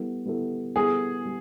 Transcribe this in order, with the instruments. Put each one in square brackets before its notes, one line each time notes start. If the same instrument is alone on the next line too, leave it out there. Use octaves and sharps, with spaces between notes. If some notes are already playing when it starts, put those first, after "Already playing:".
Already playing: [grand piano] G3 B3 E4 A4
G3 B3 E4 A4
[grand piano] G3 B3 E4 A4 [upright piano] G#4
[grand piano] G3